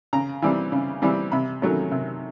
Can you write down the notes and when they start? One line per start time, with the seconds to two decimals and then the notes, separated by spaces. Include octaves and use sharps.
0.13 C#3 A#5
0.42 E3 G3 C4
0.72 C#3
1.02 E3 G3 C4
1.32 C3 B5
1.62 D#3 F#3 A3 C#4
1.92 C3